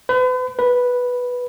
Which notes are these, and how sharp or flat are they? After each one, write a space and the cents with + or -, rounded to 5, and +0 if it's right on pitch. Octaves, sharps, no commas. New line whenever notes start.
B4 +40
B4 -5